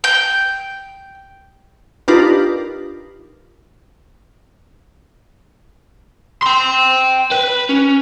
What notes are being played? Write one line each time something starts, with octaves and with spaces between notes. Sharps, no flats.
G5
D4 D#4 F4 G4 A#4 B4
G5 C6
B4
C#4